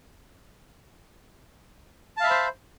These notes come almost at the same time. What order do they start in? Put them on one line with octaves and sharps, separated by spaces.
A5 F5 E5 B5 C5